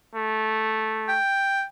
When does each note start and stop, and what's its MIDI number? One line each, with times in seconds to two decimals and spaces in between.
0.15 1.18 57
1.08 1.64 79